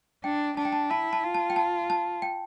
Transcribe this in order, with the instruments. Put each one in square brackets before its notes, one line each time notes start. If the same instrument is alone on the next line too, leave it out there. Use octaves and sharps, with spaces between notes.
[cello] D4 [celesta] G5
[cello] D4 [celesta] A5
[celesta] G5
A5
[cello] E4 [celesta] A5
[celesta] A5
[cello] F4
[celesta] A5
G5
A5
A5
G5